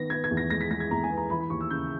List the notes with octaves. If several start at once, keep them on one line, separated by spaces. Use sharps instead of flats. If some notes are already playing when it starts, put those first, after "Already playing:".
Already playing: D#3 B3 A#6
B3 G#6
G#6
E2
A#6
G#3 A#6
B6
G#3 A#6
G#6
E2 A#5
G#5
B3
A#5
E3 B5
B5
D#2 C#6
E6
C#3 G6